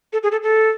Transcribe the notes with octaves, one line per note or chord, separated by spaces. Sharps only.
A4
G#4
A4
A4